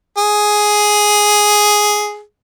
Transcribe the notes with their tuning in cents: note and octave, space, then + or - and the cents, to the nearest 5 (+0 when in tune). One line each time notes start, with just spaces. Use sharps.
G#4 +5